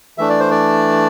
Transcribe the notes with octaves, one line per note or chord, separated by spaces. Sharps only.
E3 A3 D4 E5
D5
C5
D5